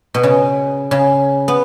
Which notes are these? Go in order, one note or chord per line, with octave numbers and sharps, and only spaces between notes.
B2
C#3
C#3
B3